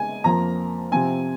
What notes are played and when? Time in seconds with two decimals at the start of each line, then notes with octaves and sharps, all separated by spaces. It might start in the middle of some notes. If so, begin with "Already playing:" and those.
Already playing: G#3 D#4 G#5
0.24 F2 F3 A#3 A#5
0.91 C3 F3 C4 G#5